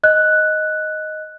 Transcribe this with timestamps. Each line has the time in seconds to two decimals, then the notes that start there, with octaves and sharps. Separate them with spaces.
0.04 D#5 F#6